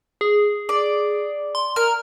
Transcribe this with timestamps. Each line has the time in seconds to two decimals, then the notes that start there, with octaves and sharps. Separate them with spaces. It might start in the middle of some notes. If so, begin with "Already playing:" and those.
0.21 G#4
0.69 D5
1.55 C6
1.76 A#4 F6